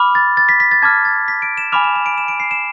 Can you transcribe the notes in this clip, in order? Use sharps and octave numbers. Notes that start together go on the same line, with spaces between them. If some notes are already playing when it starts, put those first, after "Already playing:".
Already playing: B5 D6 F6
A6
A6
B6
B6
A6
A5 D6 F6 G#6
A6
B6
D7
E7
G#5 B5 D6 F6 F7
E7
E7
D7
E7
D7
C7
E7